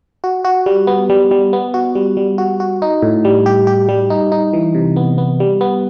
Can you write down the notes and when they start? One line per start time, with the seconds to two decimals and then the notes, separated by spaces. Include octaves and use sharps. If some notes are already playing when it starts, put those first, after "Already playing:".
0.24 F#4
0.45 F#4
0.66 G3
0.87 B3
1.10 G3
1.31 G3
1.53 B3
1.74 F#4
1.95 G3
2.17 G3
2.38 F#4
2.60 F#4
2.82 D#4
3.02 A2
3.25 G3
3.46 G4
3.67 G4
3.89 G3
4.10 D#4
4.32 D#4
4.53 E3
4.75 C3
4.96 B3
5.18 B3
5.40 G3
5.61 B3